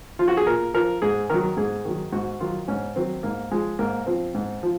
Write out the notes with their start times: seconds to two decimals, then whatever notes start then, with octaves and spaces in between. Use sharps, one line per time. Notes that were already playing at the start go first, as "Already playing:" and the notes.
0.19 F3 F4
0.28 F#4
0.37 G#4
0.46 A#2 A#4
0.74 F3 A#4
1.02 G#2 G#4
1.30 D#3 F#3 A#4
1.57 G#2 G#4
1.85 D#3 F#3
2.12 G#2 F#4
2.40 D#3 F#3 F4
2.68 G#2 C#4
2.96 D#3 F#3 C4
3.23 G#2 A#3
3.51 F3 G#3
3.79 G#2 A#3
4.06 F3 C4
4.35 G#2
4.63 F3